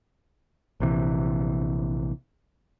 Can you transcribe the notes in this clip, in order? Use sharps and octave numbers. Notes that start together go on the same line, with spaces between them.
A#1 C3 E3